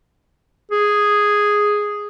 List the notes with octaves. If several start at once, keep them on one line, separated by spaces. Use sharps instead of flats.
G#4